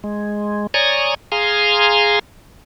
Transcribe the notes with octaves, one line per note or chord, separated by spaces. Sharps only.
G#3
C#5 D5 G#5 A#5 C#6 D#6
G#4 F5 G#5 A#5 C6